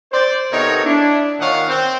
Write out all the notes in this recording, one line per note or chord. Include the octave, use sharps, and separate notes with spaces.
C5 D5
C3 B3 D#4 A4 A#4 C#5
D4 E4
A#2 D#3 C#5 D#5 F5 F#5
C4